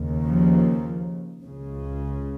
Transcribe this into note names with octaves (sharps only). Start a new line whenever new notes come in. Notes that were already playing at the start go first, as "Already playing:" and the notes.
Already playing: D#2 C#3
F3
C#2 C#3